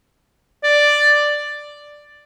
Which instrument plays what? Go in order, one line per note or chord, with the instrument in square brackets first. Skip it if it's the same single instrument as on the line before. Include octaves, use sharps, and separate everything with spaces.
[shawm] D5